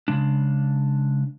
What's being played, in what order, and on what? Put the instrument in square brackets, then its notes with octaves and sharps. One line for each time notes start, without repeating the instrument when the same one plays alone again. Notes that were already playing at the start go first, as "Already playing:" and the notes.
[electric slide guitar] C#3 G#3 D4